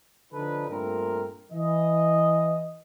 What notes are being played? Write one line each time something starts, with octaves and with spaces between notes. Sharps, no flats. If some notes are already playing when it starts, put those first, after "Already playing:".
D3 F3 D4 D#4 A4 B4
G2 A#2 A3 C4 A#4
E3 D#5